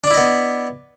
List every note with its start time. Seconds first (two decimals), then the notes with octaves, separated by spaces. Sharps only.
0.04 D4
0.07 D5
0.11 E4
0.14 D#5
0.17 B3